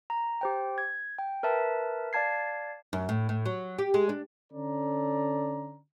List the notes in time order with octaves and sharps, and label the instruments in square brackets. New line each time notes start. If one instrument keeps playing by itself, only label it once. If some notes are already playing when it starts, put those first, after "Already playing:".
[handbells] A#5
G4 C5 G5
G#6
G5
A#4 B4 E5 A5
D5 F5 A5 G#6 C7
[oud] F#2
A2
A2
F#3
G4
G#3
D4
[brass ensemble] D3 C#4 A4 D5 A#5